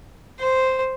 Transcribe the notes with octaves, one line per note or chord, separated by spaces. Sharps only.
C5